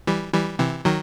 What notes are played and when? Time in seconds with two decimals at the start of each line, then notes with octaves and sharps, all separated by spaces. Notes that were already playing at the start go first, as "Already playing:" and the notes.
0.07 E3 G3
0.33 E3 G3
0.59 C3 E3
0.85 D#3 F#3